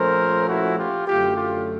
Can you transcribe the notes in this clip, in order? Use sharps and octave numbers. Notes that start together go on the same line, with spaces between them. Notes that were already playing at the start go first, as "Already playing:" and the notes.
Already playing: A#2 F3 A3 C#4 A#4 C5
E4 F#4
F4 G4
F#2 D3 F#3 A3 F4 G4
F4 G4